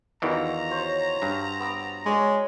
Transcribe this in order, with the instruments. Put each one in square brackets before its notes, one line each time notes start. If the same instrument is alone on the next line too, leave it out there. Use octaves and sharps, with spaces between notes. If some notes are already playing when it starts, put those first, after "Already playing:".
[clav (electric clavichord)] E2 D#3 E3 [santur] F4 F#4 B5 [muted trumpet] A#5
[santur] F#4 C5 C#5
[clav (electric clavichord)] G2
[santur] B3 D6 E6
[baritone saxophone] G#3 [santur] C#5 D5